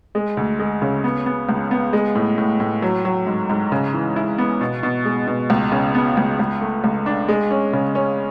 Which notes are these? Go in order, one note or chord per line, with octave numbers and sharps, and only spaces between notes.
G#3
D2
G#3
C#3
B3
B3
C#2
B3
G#3
A2
A2
A2
F#3
F#3
G#2
G#2
C#3
E3
E4
B3
B2
B2
G#3
B2
C#2
C#3
B3
C#2
C#2
A3
C#2
D4
G#3
C#4
C#3
C#4